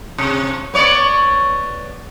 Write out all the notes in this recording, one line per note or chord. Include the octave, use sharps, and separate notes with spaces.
C3
B3 C#5 D5